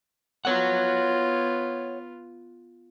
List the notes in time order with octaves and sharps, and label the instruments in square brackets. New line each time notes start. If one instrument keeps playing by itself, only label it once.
[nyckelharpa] B3 F4 [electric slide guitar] C#5 F#5